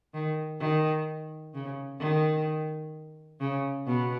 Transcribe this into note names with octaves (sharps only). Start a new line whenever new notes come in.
D#3
D#3
C#3
D#3
C#3
B2